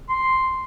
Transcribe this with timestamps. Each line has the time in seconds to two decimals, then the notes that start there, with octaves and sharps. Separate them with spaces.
0.09 C6